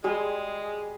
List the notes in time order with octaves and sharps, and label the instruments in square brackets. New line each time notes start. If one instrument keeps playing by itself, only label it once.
[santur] G3 G#4 C6 [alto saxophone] G#3